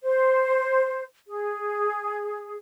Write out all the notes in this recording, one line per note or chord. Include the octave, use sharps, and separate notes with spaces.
C5
G#4